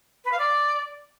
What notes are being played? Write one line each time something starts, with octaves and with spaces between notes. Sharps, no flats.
B4
F5
D5